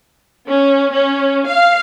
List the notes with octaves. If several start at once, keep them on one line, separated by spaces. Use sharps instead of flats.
C#4
C#4
F5